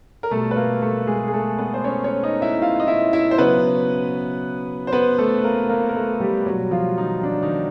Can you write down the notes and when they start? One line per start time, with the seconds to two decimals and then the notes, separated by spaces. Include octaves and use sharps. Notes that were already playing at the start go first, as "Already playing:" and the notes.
0.23 A#4
0.31 B2 G3 A3 A4
0.51 B4
0.56 A#3 A#4
0.82 A3 A4
1.07 G#3 G#4
1.28 G#4
1.34 A3 A4
1.58 B3 B4
1.74 C5
1.84 C#4 C#5
2.04 C#4 C#5
2.23 D#4 D#5
2.42 E4 E5
2.62 F4 F5
2.80 D#5
2.87 E4 E5
3.13 E4 E5
3.31 C5
3.38 C#3 F#3 B3 B4
4.87 C5
4.92 B3 B4
5.18 A3 A4
5.44 A#3 A#4
5.69 A#3 A#4
5.89 A#4
5.95 A3 A4
6.20 G3 G4
6.46 B2 F#3 G3 F#4
6.71 F3 F4
6.98 D#3 D#4
7.23 D4
7.42 D#3 D#4